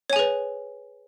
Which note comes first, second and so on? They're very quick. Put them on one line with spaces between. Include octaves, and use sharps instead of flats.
C#5 G#5 G#4 B4